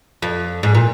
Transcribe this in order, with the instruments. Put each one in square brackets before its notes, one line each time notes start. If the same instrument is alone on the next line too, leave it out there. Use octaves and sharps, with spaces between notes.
[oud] F2
G#2
A#2